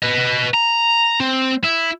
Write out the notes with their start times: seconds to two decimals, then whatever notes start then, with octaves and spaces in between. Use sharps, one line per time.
0.03 B4 D#5
0.54 A#5
1.20 C4
1.64 E4